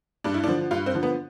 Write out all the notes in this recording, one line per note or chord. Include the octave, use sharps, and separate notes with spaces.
G2 D4
E4
D4
D3 F3
G2 F4
C4
D3 F3
B3